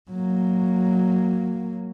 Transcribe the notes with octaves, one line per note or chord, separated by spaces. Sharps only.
F#3 A#3